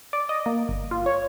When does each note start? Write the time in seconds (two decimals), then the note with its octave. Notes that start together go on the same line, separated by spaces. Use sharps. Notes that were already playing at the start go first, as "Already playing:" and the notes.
0.13 D5
0.29 D#5
0.46 A#3
0.69 G1
0.91 F4
1.06 C#5